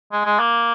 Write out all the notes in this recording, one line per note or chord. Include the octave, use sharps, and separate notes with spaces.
G#3
G#3
A#3